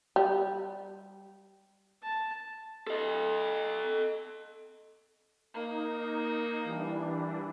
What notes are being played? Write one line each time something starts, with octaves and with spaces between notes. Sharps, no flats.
G3
A5
A4 D#5
A#3 D#4
E3 G3 D4